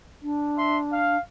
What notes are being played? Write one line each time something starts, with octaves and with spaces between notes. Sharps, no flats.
D4
E5 C6
F5